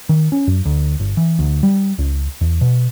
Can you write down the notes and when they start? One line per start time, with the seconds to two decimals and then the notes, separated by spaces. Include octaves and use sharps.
0.09 D#3
0.32 C#4
0.47 F#2
0.65 D2
1.00 G1
1.17 E3
1.39 D2
1.63 G3
1.98 C#2
2.41 E2
2.61 B2